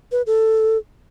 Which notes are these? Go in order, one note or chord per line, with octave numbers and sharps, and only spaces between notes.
B4
A4